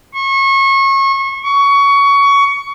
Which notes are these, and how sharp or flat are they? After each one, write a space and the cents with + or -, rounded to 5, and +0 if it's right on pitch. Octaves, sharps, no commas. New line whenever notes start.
C#6 -30
C#6 +20